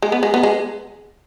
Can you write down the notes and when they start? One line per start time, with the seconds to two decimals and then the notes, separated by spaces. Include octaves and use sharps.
0.02 G#3
0.12 B3
0.23 G#3
0.34 B3
0.43 G#3